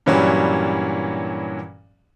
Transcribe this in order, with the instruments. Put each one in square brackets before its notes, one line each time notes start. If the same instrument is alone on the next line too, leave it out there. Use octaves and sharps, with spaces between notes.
[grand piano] G2 A#2 E3 F#3 G3 C#4